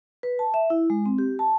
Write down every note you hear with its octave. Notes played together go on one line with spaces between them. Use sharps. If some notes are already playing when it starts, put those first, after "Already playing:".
B4
A5
E5
E4
G#3
C4
G4
A5